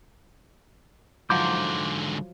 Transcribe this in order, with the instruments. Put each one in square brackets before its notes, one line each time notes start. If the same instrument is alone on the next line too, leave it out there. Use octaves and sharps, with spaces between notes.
[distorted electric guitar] G#2 D3 [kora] F3 F#3 C5 [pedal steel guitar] C6 D6 G6